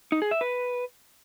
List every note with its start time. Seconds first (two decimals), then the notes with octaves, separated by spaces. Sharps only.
0.12 D#4
0.22 G#4
0.31 E5
0.41 B4